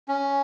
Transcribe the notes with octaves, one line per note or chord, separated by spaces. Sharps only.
C#4